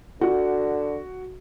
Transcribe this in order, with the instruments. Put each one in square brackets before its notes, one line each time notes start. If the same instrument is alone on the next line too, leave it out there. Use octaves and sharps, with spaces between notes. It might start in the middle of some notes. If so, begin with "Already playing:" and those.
[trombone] D3 [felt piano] F#4